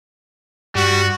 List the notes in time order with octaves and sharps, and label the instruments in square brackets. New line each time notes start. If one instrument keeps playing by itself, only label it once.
[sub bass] G2 [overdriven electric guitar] G3 [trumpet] F#4